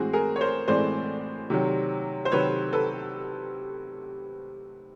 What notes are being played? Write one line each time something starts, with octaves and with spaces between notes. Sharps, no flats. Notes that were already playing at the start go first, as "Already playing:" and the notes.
Already playing: A2 E3 G#3 C4 F#4 G#4
G#4 A#4
C#5
A#4 C5
A2 E3 G#3 C4 C5 D5
C3 D#3 F#3
C5
C3 D#3 F#3 B4 C#5
A4 B4